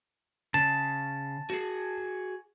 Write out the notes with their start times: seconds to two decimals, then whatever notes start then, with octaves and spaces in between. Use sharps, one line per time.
0.54 C#3 A5
1.50 F#4 G#4